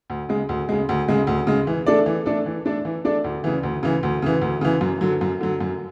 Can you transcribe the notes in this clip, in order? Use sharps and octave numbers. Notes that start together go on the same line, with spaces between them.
D2
C#3 G#3
D2
C#3 G#3
D2
C#3 G#3
D2
C#3 G#3
E3
A3 D4 A4 D5
E3
A3 D4 A4 D5
E3
A3 D4 A4 D5
E3
A3 D4 A4 D5
D2
C#3 E3
D2
C#3 E3
D2
C#3 E3
D2
C#3 E3
F#2
D3 F#3
F#2
D3 F#3
F#2